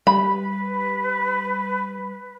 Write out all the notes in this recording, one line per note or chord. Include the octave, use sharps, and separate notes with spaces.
G3 B4 B5